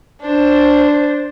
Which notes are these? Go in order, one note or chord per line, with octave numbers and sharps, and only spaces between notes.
D4 C5